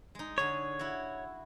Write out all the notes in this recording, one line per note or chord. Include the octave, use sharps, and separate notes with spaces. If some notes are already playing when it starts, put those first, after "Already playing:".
G#3 D#4
D3 G#4 C#5 A5
E4 F#4